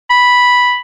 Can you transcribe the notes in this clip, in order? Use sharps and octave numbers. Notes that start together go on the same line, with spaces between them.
B5